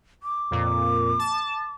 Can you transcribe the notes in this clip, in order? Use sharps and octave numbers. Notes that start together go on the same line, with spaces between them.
D6
F2 A#2
A5